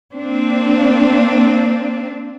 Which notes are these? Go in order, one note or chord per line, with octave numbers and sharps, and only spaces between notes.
A#3 C4 D4